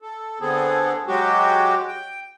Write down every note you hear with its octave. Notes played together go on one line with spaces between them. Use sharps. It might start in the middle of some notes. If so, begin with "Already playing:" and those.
A4
D3 B3 C4 G#4 A4
F#3 G#3 F#4 G4
G5